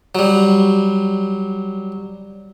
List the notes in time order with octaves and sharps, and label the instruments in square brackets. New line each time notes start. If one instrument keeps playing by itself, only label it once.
[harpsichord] F#3 G3